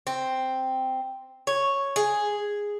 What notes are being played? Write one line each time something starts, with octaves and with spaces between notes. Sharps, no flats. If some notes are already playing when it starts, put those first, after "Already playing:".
C4
C#5
G#4